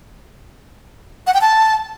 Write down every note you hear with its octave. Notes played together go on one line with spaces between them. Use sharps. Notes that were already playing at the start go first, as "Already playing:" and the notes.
F#5
G5
A5